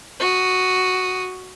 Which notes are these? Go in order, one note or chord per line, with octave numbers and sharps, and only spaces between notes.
F#4 D#6